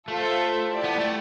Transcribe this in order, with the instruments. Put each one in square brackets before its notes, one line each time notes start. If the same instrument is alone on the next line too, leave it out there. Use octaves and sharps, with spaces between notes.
[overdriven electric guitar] A3 [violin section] F4 A4 C5 E5
[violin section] E4 G4 D5 A5
[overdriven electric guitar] B3
A3